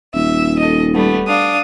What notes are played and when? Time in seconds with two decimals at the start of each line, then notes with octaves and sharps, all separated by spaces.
0.15 D#1 E5
0.59 A4 D#5
0.94 G3 A3 B3
1.27 D4 F5 D#6